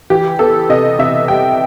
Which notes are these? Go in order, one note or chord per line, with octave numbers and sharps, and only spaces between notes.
E3 G4
B3 A4
C3 D#5
C3 E5
G3 G5